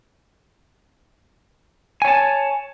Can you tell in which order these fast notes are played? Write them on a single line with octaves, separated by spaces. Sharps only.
G#5 C#5 A5